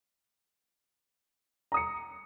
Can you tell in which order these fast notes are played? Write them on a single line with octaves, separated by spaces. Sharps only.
A#5 D#6 C#7